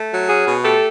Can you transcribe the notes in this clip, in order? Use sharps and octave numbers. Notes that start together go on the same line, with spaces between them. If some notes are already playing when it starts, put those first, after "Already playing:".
Already playing: A3
F#3
C#4 F#4 G#4
B2
A3 G4 A4